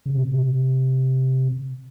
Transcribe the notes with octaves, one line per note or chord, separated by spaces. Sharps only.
C#3
C3
A#2
C3